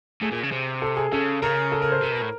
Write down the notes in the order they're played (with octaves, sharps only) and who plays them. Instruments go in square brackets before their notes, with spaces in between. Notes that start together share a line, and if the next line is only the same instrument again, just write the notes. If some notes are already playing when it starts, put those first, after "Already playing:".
[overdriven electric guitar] A2 [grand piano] G#4
[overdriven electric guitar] A#2
C#3
C3
[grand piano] A4
G#4
[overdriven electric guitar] C#3 [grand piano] A4
[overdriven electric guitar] C#3 [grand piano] A#4
[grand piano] A4
A#4
C5
[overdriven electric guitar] C3 [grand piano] A#4
[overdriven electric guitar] B2
A2